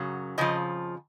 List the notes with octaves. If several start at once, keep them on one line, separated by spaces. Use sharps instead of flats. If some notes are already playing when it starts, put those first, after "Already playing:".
Already playing: F#2 C#3 F#3
F2 C#3 F3 D#5